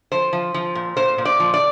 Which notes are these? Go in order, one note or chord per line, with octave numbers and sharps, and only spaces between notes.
F3 C5
F3
F3
A#2
A#2 C5
A#2
D5
F3
D5